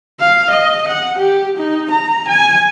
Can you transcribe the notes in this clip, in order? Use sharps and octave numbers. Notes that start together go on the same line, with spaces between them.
F5
D#5
F#5
G4
D#4
A#5
G#5